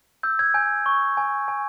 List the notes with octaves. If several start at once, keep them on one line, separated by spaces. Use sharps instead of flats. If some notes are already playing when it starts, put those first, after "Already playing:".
E6 G6
G#6
G#5 G6
C#6
G#5
G#5